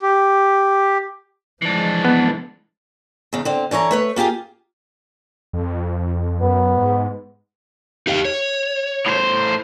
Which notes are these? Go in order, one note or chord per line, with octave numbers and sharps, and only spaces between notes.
G4
E3 F3 G#3 D4
B3
E2 C#3
D3 C4
D3 E3 C#5 A#5
A3 B4 C#5
A#3 F4 G4 G#4
F2
F#2 B3
G#2
D#4 G4 F5
C#5
A2 C5